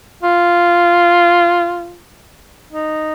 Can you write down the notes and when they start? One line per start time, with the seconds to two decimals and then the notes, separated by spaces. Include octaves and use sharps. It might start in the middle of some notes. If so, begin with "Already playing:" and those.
0.23 F4
2.72 D#4